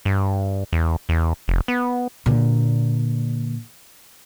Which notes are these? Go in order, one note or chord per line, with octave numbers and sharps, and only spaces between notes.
G2
E2
E2
F1
B3
A#2 D3